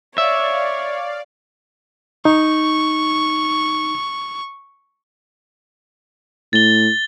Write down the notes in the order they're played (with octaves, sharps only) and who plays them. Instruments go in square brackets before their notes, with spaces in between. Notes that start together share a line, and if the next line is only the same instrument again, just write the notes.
[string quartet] C#5 [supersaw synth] D5 F5 [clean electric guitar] E5
[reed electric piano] D#4 [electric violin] C#6
[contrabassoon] A2 [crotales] A6 G7